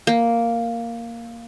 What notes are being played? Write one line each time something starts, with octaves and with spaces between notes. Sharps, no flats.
A#3